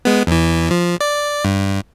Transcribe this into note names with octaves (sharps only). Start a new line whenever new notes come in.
G#3 B3
E2 E3
F3
D5
G2